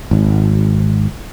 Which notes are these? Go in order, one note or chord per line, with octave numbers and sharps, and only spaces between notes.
G#1